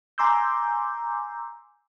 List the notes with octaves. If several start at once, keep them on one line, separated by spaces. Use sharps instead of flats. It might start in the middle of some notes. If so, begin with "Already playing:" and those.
G#5 A#5 C6 D6 E6 G6